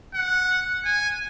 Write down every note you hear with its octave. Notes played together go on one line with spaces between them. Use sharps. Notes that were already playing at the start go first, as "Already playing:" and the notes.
F#5
G#5